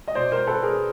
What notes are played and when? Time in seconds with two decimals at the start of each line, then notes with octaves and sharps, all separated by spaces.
0.08 D#5
0.15 B2 C5 D5
0.32 A#4 C5
0.47 A4 B4
0.63 G#4 A#4